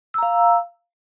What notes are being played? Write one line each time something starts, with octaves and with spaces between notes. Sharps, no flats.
F5 A#5 E6